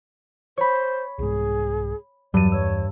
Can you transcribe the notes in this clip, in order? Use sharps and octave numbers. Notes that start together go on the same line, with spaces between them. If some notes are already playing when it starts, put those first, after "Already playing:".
C5 C#5 B5
C2 G#2 G#4
E2 G2 F#3 D5 D#7
C#5 E6